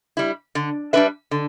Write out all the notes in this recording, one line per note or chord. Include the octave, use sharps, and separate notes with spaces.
G3 E4
D3
G3 D4 B4 E5
D3